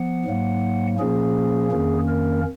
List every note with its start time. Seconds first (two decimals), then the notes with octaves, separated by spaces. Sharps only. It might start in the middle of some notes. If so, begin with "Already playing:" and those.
Already playing: F3 B3 F#5
0.25 G#2 F#3 A#3
0.99 A#2 F3 A#3 C#4 G#4
1.72 F2 D#3 A#3 C#4
2.08 A#4